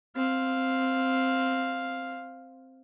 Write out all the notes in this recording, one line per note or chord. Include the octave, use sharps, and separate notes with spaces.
C4 F5